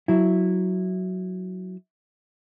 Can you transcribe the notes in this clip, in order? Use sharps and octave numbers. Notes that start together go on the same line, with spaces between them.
F#3 E4